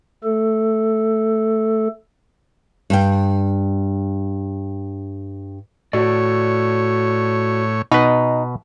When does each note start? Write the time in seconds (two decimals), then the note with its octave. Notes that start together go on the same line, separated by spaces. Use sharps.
0.24 A3 A4
2.90 G2 G5
5.93 A2 F#4 C#5 D5
7.92 B2 D#4 B4